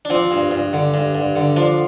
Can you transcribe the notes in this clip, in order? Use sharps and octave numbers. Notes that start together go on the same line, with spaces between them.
D4
F3 C4
G2
G2
D3
G2
G2
D3
F3 D4